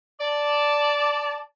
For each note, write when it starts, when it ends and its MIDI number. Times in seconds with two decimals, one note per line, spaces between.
0.20 1.39 74
0.20 1.39 81